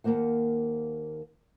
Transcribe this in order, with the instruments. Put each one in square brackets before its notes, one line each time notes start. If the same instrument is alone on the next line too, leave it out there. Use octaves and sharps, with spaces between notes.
[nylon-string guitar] D#2 A3 A#3 C5 F#5